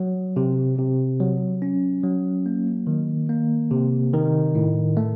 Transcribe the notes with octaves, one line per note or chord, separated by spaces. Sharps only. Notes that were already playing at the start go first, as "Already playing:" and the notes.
Already playing: F#3
C3
C3
F#3
C#4
F#3
A#3
D#3
A#3
C3
D#3
A2
A3